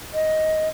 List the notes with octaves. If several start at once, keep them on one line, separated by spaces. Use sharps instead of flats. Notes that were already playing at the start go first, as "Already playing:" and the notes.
D#5